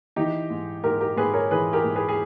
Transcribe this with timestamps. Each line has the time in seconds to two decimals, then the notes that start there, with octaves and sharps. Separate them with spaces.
0.16 E3 D#4 G4
0.50 G#2
0.84 G#2 G4 A#4
1.00 G4 A#4
1.17 G#2 G#4 B4
1.34 A#4 C#5
1.51 E3 G#4 B4
1.73 G4 A#4
1.84 G#2
1.95 G#4 B4
2.09 G#4